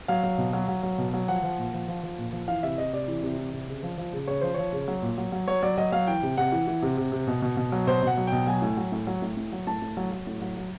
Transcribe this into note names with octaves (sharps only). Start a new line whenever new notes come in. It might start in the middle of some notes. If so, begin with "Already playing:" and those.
F#3 F5
F#3
B2
F#3
F#3
F#3
B2
F#3
F3 F#5
F3
A#2
F3
F3
F3
A#2
F3
E3 F5
C3 E5
C3 D#5
C3 D5
E3
C3
E3
C3
C#3
F3
F3
C#3
C#3 C#5
F3 C5
F3 C#5
C#3
F#3
A#2
F#3
F#3
F#3 C#5
F#3 D5
F#3 D#5
F#3 F5
E3 G5
C3
C3 F#5
E3
E3
C3
C3
C3
B2
B2
B2
F#3
B2 C5
B2 F#5
F#3
G5
B2
F#3 G#5
A2
F#3
A2
F#3
A2
A2
F#3
A2 A5
A2
F#3
F#3
A2
F#3
F#3